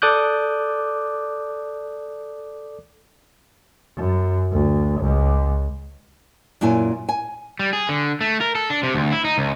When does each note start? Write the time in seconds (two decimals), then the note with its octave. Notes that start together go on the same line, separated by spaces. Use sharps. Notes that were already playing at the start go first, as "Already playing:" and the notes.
0.02 A4 D5 D6 D#6 F#6 G6
3.96 F#2
4.52 D2
5.00 C#2
6.61 F#2 A#2 E4 G#5
7.09 G#5
7.59 G3
7.73 G#4
7.89 D3
8.21 A3
8.41 A#4
8.55 A4
8.70 D4
8.83 C3
8.94 D2
9.12 E4
9.25 D#4
9.38 C#2